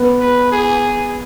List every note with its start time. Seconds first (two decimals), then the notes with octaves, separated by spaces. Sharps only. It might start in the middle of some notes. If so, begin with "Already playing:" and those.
Already playing: B3
0.21 B4
0.52 G#4